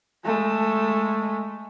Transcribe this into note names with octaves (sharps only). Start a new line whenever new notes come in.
G#3 A3